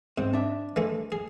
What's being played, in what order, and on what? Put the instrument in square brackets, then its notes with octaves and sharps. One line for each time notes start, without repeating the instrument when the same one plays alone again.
[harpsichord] G#2 [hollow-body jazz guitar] C4
[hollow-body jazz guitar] D4 E5
[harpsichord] E3 G#3 A3
G#4